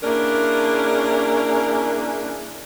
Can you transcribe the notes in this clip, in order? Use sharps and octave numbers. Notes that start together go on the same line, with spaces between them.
A#3 C#4 D4 E4 G#4 A#4